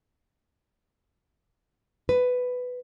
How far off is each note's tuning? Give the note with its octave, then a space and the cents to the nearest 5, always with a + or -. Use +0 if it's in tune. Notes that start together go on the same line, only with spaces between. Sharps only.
B4 +10